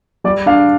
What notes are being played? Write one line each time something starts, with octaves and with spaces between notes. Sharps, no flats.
G3 D5
D4 F5